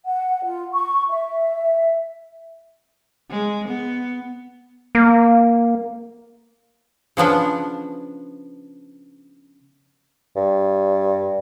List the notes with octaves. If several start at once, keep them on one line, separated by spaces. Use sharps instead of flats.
F#5
F4
C#6
E5
G#3
B3
A#3
C#3 F3 B3 D4
G2